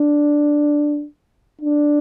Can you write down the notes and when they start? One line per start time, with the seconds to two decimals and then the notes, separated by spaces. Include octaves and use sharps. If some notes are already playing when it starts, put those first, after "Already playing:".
Already playing: D4
1.61 D4